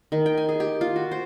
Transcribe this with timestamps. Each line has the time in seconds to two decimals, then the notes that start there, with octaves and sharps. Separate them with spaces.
0.12 D#3
0.26 G5
0.38 G#5
0.49 G#4
0.60 G4
0.81 F4
0.96 F#4
1.11 C5